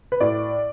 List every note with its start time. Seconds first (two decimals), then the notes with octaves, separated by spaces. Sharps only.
0.12 B4
0.20 A2 D5